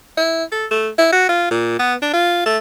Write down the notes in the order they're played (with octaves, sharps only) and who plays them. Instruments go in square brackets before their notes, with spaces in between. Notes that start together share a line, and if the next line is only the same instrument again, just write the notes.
[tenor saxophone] E4
A4
A3
E4
F#4
F4
A#2
B3
D4
F4
A3